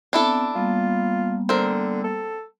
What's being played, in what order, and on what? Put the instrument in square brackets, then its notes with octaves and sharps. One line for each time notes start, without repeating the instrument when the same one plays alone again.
[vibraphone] B3 C4 [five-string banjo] D4 E4 A4
[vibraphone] G3 A#3 B3 [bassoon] F4
[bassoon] D3 [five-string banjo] C4 A#4
[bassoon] A4